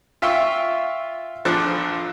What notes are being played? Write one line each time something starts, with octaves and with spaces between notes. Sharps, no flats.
F4 E5 F5 G5 C#6 E6
A#1 F3 D4 A4 F#6